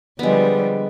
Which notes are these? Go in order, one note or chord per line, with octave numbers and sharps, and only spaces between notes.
D3 F3 G3 G#3 B3